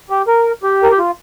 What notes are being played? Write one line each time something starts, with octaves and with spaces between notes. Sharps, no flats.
G4
A#4
G4
A#4
G4
F4